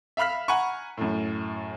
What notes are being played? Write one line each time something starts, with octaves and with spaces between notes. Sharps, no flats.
E5 F5 B5 F6 B6
F#5 G#5 A#5 B5 C#6
F#2 A2